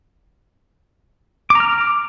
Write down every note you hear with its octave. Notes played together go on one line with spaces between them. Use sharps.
A#5 D6 F6